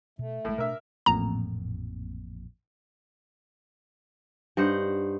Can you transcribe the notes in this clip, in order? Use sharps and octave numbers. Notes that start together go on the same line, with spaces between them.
B2 A3
A1 A2 G#3
B2 D4 A#4 E5
A1 F2 A#2 A#5
G2 D#4 C5 F#5